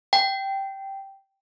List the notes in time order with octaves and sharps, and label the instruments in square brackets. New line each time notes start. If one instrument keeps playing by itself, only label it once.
[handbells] G5